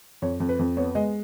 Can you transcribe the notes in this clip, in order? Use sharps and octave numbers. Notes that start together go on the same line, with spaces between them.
F2 C#5
F2
B4
F2
B3 C#5
G#3 D#5